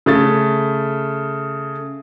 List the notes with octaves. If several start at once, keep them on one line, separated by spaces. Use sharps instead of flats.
C#3 A3 A6